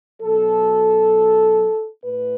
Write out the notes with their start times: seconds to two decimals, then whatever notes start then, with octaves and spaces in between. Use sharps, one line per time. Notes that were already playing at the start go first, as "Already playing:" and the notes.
0.21 B2 F#3 A4
2.04 A2 B4